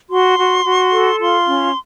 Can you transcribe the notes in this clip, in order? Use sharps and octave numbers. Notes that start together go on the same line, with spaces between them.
F#4 C6
F#4
F#4
A4
F4 C6
C#4